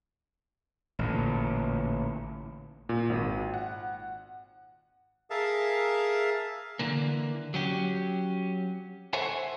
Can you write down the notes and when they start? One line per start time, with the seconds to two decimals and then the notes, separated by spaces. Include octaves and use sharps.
0.99 A1 A#2 D3
2.89 A#2
3.10 G#1
3.54 F#5
5.30 G#4 A#4 E5 F5 A5
6.79 D3 E3 A#3
7.54 F#3 C#4 G4
9.13 A4 C5 C#5 E5 F#5 G#5